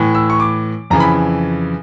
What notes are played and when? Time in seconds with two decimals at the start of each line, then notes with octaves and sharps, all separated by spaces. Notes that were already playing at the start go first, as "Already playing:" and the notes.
Already playing: A2 E3
0.15 E6
0.30 C#6
0.40 D6
0.90 F2 C#3 E3 A#5
1.00 B5